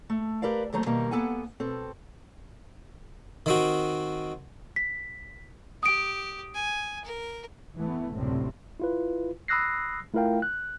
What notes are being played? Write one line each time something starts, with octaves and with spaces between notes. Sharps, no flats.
A3
G4 A#4 B4 D5 F5
D#2 D3 F#3 A3 C5 A#5
B2 D#3 G3 A#3 F5
A#3 B3 A4 F#5 G#5
B2 C4 A4
D#3 C4 F#4
B6
G4 D#6 D7
G#5
A#4
E3 A3 B3
F#1 D2 A2 C3 G3 C4
E4 F4 B4
B5 D#6 E6 F#6 A#6 C7
A3 E4 F4 A#4 F5 G5
F#6